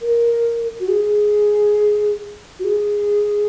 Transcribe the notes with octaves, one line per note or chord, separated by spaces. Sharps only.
A#4
F#4
G#4
F#4
G#4